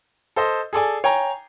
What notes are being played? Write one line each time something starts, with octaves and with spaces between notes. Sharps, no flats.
A4 C5 D#5
G#4 A4 D5 G#5
C#5 G5 G#5 A#5